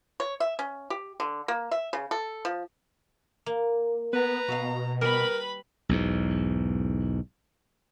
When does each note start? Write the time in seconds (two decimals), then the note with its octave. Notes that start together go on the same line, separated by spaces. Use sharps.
0.20 C#5
0.40 E5
0.59 C#4
0.90 G4
1.20 D3
1.48 A#3
1.71 E5
1.93 C#3
2.11 A4
2.45 F3
3.46 A#3
4.13 B3 B4 A#5
4.48 B2 F#4 D#5 F5
5.01 G3 A#4 B4 B5
5.89 B1 E2 G#2